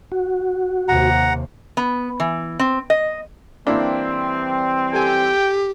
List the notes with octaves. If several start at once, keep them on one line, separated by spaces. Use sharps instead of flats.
F#4
D#2 C3 F#5 A#5
B3
E3
C4
D#5
E3 G3 A#3 C4 D4 E4
G4 A4 G5 G#5